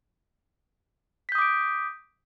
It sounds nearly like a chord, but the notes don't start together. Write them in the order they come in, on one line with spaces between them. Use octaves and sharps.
B6 G6 D#6 D6 D7